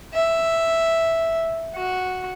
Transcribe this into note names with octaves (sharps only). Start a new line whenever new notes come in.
E5
F#4